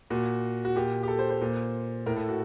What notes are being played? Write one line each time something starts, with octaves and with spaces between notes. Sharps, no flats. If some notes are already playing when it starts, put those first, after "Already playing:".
A#2 F#4
F#4
A#2 G4
G4
A4
C5
C5
A#2
A2 A#4
A4
F#4